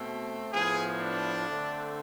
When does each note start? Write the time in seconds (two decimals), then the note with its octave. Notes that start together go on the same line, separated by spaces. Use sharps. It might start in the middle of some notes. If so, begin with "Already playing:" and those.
Already playing: B2 A3 C4
0.53 A2 F3 B3 G#4
1.00 D4
1.47 D3 A3 C4